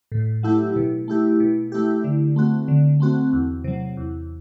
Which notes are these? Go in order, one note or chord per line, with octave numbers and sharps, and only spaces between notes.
A2
F#3 A3 E4 G4
B2
A3 E4 G4
B2
A3 E4 G4
D3
A3 C4 F#4
D3
A3 C4 F#4
E2
C3 F#3
E2